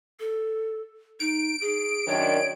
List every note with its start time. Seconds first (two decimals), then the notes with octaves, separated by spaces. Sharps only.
0.20 A4
1.20 D#4 D7
1.61 G#4
2.08 F#2 D#3 D4 C#5